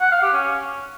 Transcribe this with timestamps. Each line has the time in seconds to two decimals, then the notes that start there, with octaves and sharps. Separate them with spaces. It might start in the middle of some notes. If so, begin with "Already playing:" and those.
0.01 F#5
0.12 F5
0.22 G4
0.33 C#4